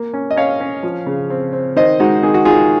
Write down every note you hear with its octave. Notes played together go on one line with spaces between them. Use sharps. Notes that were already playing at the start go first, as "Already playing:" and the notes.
Already playing: A#3
C#4
D#5
C#4 C#5 F5
C#4
F3
C#3
C4
C4
D#3 C5 D#5
G#3 D#4 F#4
D#3 G#4
F#4
D#3 F4 G#4